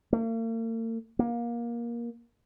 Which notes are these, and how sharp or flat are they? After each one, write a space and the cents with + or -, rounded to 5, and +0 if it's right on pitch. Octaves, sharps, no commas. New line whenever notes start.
A#3 -45
A#3 +20